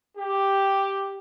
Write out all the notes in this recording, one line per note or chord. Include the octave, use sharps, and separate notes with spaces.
G4